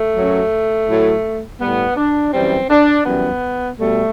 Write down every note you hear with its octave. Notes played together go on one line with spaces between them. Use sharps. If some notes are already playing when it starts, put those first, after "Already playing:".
Already playing: A3
F#2 F#3
A2 F#3
A2 G3 B3
D4
F#2 E3 G3 C4
D4
F#2 E3 G3 B3
B2 G3 A3